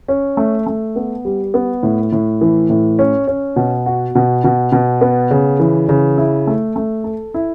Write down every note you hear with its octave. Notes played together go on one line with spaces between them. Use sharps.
C#4
A3
A3
B3
G3
B3
A2
A2
E3
A2
C#4
C#4
B2
F#4
B2
B2
B2
B3
C#3
E3
C#3
E4
A3
A3
A4
E4